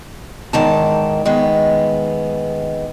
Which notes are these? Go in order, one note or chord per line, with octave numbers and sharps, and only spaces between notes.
E2 G#2 D#3 A5
D#3 G#3 B3